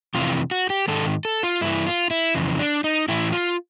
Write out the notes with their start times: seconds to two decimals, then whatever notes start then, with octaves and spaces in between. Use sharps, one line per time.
0.14 F2 C3 E3 F4
0.51 F#4
0.70 G4
0.88 G#2 D#3 A4
1.25 A4
1.43 F4
1.61 G2 E3 E4
1.86 F4
2.11 E4
2.35 F2 C#3 E3
2.59 D4
2.84 D#4
3.08 A2 E3 E4
3.33 F4